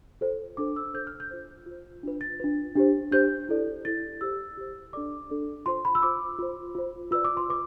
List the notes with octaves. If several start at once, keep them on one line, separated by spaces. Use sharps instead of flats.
F4 A4 C5
D4 A4 C5 D6
E6
D4 A4 C5 G6
F6
G6
F4 C5
F4 C5
D4 F4 B4
A6
D4 F4 B4
D4 G4 C5
D4 G4 C5 G6
E4 A4 D5
E4 A4 D5 A6
G4 C5 E6
G4 C5
D4 A4 D5 D6
D4 A4 D5
F4 C5 C6
B5
E6
F4 C5 D6
F4 C5
F4 C5
F4 B4 D5 E6
D6
C6
F4 B4 D6